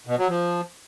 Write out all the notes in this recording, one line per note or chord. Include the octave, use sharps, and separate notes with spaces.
B2
F#3
F3